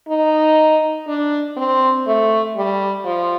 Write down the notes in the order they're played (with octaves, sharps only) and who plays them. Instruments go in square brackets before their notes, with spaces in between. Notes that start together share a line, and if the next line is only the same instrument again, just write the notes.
[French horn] D#4
D4
C4
A3
G3
F3